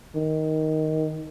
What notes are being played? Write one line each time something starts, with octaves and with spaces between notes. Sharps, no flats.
D#3